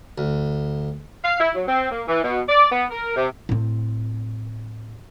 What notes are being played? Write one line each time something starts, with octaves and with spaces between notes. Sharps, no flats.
D2
F5
E4
F#3
C4
A#3
E3
B2
D5
B3
A#4
C3
A2 C4